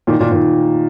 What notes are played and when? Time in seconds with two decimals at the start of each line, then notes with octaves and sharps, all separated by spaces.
0.07 A#2 D#3
0.19 A#2 D#3
0.32 A#2 D#3